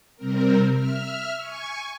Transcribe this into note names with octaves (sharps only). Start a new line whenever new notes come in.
C3 G3 C4 A#4
E5 F6
G#5 C#6